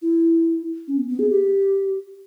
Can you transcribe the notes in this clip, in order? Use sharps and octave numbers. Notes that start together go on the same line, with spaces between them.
E4
C#4
B3
B3
G#4
G4